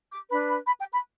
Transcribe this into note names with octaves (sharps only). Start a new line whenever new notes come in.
D6
D4 B4 B5
B5
B5
G5
B5